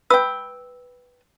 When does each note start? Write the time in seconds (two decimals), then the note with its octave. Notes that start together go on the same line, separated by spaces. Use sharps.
0.10 B4 G5 E6